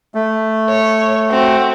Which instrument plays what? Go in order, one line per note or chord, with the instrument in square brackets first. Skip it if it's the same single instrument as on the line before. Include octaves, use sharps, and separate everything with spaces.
[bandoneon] A3
[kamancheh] C#5
C4 F#4